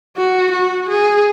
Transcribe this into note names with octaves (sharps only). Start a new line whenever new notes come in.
F#4
F#4
G#4